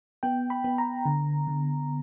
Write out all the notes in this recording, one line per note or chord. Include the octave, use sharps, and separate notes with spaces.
B3 G5
B5
B3
A#5
D3
D3